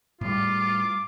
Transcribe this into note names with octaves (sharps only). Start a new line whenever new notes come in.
A2 G3 F4 D6